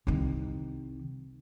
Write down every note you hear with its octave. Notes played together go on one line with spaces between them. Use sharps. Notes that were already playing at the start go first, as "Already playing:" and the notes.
C2 D#3